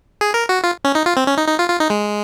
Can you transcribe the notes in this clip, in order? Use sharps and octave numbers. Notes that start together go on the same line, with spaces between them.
G#4
A#4
F#4
F4
C#4
D#4
F4
C4
C#4
D#4
D#4
F4
F4
D#4
G#3